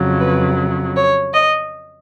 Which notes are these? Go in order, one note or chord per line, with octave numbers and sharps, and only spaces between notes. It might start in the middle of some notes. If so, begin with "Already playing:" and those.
Already playing: F2 C#3 F#3
B4
C#5
D#5